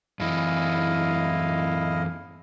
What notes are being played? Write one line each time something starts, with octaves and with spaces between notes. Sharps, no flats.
F#2 E3 E4 D#5 F5